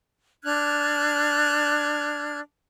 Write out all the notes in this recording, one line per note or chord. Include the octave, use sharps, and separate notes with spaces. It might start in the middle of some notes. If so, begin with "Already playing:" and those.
D4 F6 F#6 G#6